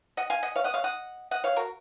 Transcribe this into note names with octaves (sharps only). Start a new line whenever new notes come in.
D#5 F#5
F5 G#5
D#5 F#5
C#5 F5
D#5 F#5
C#5 F5
D#5 F#5
D#5 F#5
C#5 F5
F#4 A#4